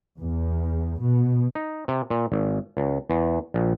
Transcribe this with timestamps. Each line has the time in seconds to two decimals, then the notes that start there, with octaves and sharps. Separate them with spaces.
0.18 E2
0.99 B2
1.55 D#4
1.88 C3
2.10 A#2
2.32 G#1
2.77 C#2
3.10 E2
3.54 A#1